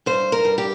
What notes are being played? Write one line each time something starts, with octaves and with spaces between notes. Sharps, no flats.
G2 C5
A#4
G2
G4